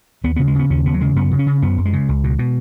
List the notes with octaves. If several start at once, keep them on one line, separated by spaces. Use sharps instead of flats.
D#2 B3
C#3 B3
G#3
C#3 B3
D#2 C#4
D#2 B3
F#3
C#3 G#3
F#2 B3
C#3
C#4
C#3
F#2 B3
F#2
G#3
C#3
C#2
B2
B2